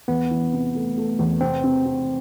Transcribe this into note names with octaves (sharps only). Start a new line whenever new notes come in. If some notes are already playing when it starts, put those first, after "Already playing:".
E2 B3
E3
C3
A3
A3
E2
C3 C4
C3
C3